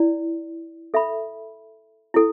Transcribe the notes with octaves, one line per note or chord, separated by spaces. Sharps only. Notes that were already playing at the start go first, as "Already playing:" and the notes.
Already playing: E4 D5
A4 E5 B5
E4 A4